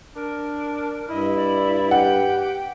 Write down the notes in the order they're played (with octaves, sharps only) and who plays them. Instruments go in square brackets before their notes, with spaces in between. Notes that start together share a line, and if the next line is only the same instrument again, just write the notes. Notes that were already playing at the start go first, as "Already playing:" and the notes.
[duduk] D4 [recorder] A#4
[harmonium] G2 [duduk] E4 [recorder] D#5
[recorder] D5
[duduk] G4 [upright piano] F#5 [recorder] G5